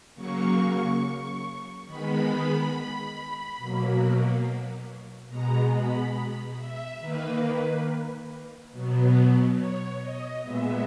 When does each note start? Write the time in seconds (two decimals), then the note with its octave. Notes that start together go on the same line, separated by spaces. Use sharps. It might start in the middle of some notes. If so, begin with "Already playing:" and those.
0.15 C#3 F#3 A#3 C#6
1.86 D#3 G#3 B3 B5
3.57 B2 F#3 A#3
5.28 B2 G#3 B3 A#5
5.72 B5
6.57 E5
6.99 D#3 A#3 B4
7.43 B4
8.71 B2 F#3 B3
9.57 C#5
9.99 D#5
10.42 A#2 G#3 B3 E5